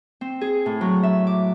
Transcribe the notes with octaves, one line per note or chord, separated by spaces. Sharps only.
C4
G#4
A2
F#3
E5
D6